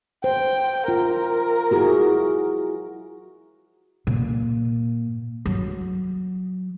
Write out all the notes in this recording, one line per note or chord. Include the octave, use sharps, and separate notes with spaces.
C5 G5
F4 A#4
E4 F#4 G#4
A#2
F#3